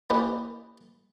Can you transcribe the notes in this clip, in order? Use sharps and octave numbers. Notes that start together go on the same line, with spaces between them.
A#3 C#4 E4 G4 B4 D#5